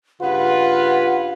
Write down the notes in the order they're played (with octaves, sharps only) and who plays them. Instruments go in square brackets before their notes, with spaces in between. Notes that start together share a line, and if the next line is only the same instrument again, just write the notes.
[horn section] G2 C#3 B4 [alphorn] F4 [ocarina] F#5